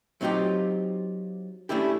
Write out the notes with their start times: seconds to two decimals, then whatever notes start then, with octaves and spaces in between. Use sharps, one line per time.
0.21 F#3 C4 D#4 F4 G4
1.69 A3 C#4 D4 E4 G4